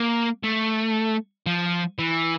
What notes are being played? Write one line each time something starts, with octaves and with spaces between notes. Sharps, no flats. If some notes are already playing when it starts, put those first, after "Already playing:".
Already playing: A#3
A3
F3
E3